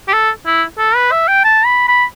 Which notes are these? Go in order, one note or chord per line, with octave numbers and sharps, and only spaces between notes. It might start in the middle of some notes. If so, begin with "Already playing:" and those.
G4
A4
E4
A4
B4
E5
G5
A5
B5
B5